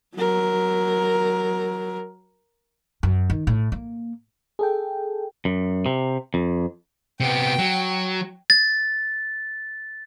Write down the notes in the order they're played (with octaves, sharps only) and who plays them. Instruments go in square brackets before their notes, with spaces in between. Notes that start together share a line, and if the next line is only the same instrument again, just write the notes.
[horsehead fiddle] F#3 A#4
[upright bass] F#2
D#3
A2
A#3
[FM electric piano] G#4 A4 G5
[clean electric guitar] F#2
C3
F2
[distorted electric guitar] C3 B3 [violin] G5
[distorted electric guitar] F#3
[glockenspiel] A6